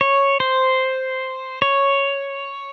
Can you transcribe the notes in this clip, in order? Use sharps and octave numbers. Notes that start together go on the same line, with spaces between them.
C#5
C5
C#5